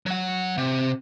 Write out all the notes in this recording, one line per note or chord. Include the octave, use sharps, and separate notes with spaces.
F#3 F#5
C3